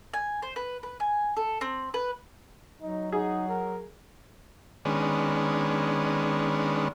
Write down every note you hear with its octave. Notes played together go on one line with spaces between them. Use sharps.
G#5
C5
B4
B4
G#5
A4
C4
B4
F#3 D#4
D#4 G#4 F#5
A#4
D#3 G#3 B3 C#4 D4